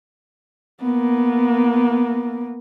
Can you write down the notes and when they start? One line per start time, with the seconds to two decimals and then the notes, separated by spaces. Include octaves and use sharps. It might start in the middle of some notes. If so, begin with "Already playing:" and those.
0.82 A#3 B3